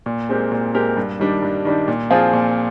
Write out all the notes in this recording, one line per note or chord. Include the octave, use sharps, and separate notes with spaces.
A#2
G#3 C4 G4 A#4
A#2
G#3 C4 G4 A#4
G2
D#3 G3 D4
G2
D#3 G3 D4
A#2
F3 C4 F4 G#4
A#2